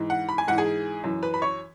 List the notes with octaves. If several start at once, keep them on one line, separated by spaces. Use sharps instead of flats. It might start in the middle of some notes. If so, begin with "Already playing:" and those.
Already playing: G#2 E3
F#5
B5
G#5
G#2 E3 F#5
G#4 G#5
F#2 E3
B4 B5
B5
C#5 C#6